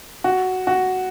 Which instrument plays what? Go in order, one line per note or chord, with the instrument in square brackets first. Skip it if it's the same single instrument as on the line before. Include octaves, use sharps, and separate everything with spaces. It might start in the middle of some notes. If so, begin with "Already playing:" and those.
[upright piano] F#4
F#4